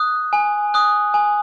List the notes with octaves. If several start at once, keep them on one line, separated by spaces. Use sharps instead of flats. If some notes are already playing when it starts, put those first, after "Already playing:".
Already playing: D#6 F#6
G#5
D#6 F#6
G#5